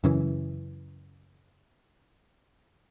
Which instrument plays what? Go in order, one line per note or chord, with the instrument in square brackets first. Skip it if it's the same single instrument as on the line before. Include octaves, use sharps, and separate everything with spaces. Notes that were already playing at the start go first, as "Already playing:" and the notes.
[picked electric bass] F#2 C#3 E3